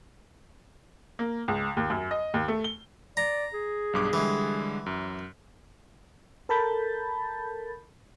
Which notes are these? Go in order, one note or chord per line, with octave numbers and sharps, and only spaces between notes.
A#3
C#2
D#2
F#2
D#5
D#2
A3
G7
D5 A#5
G#4
B1 G2 D6
D3 E3 G3 G#3
F#2
A4 A#4 A5 B5 G6 A6